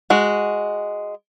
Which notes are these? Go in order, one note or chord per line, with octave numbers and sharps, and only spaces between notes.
G#3 F#4